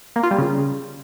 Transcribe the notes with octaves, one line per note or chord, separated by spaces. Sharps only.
A#3
F4
G3
C#3